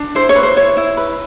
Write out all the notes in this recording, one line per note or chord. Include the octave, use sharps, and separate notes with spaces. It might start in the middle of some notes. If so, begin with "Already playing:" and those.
Already playing: D4
E4 C5
C#5
B4
C5
E4 C#5
E4
B4